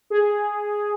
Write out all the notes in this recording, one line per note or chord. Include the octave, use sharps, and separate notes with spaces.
G#4